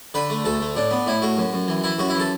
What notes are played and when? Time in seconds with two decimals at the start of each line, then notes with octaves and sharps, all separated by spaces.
0.14 D3 B4
0.30 A3
0.45 D2 A4
0.60 A3
0.76 A2 D4
0.91 B3
1.06 A2 E4
1.22 A2 F#4
1.37 F#2
1.53 F#2
1.68 E3
1.84 E3 E4
1.98 F#2 F#4
2.10 E4
2.15 E3 A4